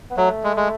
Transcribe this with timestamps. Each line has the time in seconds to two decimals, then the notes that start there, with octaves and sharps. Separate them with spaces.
0.11 B3
0.17 F#3 A3
0.44 G#3
0.56 G#3